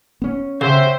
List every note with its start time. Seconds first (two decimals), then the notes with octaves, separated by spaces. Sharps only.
0.22 B3 C#4
0.61 C#3 F#3 G4 C5 E5